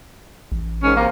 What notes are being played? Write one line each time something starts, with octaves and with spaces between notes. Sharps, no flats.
A1
G#2 D#3 C#4
C3 A#3